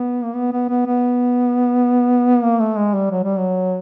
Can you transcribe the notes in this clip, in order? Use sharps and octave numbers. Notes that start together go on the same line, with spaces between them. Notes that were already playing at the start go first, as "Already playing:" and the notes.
Already playing: B3
A#3
B3
B3
B3
B3
A#3
A3
G#3
G3
F#3
G3
F#3